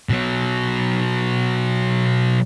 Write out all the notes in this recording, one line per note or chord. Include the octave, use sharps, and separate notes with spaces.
B2 F#3